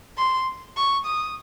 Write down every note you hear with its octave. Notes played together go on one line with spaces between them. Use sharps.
C6
C#6
D#6